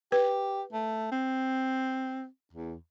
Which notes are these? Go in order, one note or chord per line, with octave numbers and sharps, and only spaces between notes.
G4 B4
A3
C4
E2